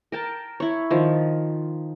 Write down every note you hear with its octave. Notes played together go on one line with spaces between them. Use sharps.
A#4 G5 A5
E4 C#5
D#3 F3